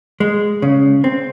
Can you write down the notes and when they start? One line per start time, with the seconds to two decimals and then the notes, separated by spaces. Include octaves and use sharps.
0.20 G#3
0.62 C#3
1.04 C4